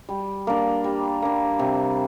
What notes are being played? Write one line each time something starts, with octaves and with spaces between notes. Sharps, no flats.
G3
A#3 D4
G3
A#3 D4
C3